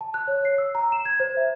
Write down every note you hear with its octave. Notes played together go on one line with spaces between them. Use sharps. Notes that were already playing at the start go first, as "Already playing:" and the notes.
A5
F#6
C#5
C7
E6
A#5
E7
G#6
C5
E5